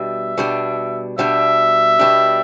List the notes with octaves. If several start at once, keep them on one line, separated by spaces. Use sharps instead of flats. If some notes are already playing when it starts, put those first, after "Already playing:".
Already playing: B2 G3 D4 E5
B2 G3 D4
B2 G3 D4 E5
B2 G3 D4